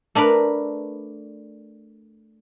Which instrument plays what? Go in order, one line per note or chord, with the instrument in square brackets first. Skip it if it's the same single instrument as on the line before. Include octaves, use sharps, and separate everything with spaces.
[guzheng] A3 D4 A#4 B4